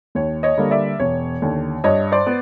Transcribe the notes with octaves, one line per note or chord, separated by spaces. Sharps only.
D#2 C#5
C#5 D#5
D3 G3 A#3
D5 E5
E1 C#5
D#2 D3
G2 C#5 D#5
C5 D5
B3